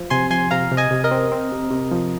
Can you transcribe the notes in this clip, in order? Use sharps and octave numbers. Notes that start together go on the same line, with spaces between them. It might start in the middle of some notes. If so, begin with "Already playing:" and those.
Already playing: F3
C3 G#5 C6
F3 G#5 C6
C3 F5 A#5
C3
D#5 G#5
C3
A#4 D#5
C4
C4
C3
C3
F3